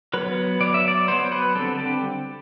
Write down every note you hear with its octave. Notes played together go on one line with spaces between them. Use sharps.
F#3 B3 B4
F#3 B3 D5
E5
D5
F#3 B3 C5
B4
D3 G3 C4 A4
G4